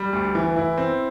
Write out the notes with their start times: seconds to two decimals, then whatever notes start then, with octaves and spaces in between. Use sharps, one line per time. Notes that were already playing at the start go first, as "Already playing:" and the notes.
Already playing: G3
0.13 D2
0.35 E3
0.56 E4
0.78 C4